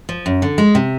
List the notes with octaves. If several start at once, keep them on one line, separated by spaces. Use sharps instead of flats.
F3
F#2
D3
G#3
C3